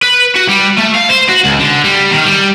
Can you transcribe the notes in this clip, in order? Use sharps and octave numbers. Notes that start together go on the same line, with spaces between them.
B4
F#4
G3
A3
F5
C5
F#4
C#2
D3
G3
D#3
G3